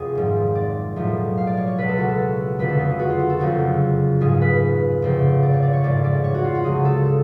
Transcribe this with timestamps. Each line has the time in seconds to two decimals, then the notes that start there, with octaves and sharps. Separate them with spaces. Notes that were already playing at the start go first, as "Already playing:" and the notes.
Already playing: F1 F2 G#4
0.15 G#1 G#2 F3
0.55 D5
0.96 B1 A2 F3
1.37 F5
1.47 D5
1.57 C#5
1.67 C#5
1.78 C#2 B2 B4
1.88 A4
1.98 F#4
2.08 A4
2.59 F1 F2 D3 B4
2.69 A4
2.79 G#4
2.89 G#4
2.99 F#4
3.10 F4
3.20 F#4
3.30 A4
3.39 F#1 F2 C#3 F3 F#4
4.21 A1 G#2 F3 G#4
4.41 B4
5.02 F1 F2 C#3 F3
5.43 D5
5.53 C#5
5.63 D5
5.73 C#5
5.83 A1 G#2 F3 D5
6.04 D5
6.24 C#5
6.34 F#4
6.44 F4
6.55 F#4
6.64 C#2 C#3 F3 G#4
6.85 A4
7.06 A4